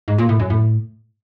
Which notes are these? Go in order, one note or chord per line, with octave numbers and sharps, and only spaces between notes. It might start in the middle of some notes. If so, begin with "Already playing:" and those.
G#2
A#2
A2
F#2
A2